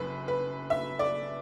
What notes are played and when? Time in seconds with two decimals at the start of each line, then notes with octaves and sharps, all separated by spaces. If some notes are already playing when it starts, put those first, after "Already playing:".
Already playing: F#1 F#2 B4
0.28 B4
0.70 E5
0.99 D5